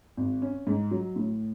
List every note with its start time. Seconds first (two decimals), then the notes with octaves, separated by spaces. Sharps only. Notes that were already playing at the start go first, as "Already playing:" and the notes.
0.17 G#1
0.42 C#4
0.67 G#2
0.91 F#3
1.16 A2